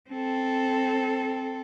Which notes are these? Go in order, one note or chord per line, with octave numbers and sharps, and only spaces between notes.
C4 A4